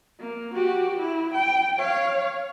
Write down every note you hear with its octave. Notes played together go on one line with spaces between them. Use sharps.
A#3
F#4 G4
E4
G5
C#5 F5